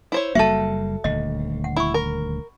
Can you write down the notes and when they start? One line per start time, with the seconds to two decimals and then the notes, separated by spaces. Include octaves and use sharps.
0.12 E4 C5 C#5
0.35 F#1 G3 A#3 F#4 A4 E5 A5
1.04 D#1 D2 D#5
1.64 F#5
1.77 E4 B5 C#6
1.94 A#4